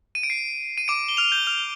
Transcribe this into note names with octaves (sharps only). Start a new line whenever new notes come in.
D#7
D7
C7
D#7
D6 D7
G7
F6 F7
G6 G7
F6 F7